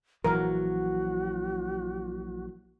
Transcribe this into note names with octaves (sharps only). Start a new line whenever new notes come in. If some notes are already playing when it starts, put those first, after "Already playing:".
A#1 E3 F#3 F#4 A#4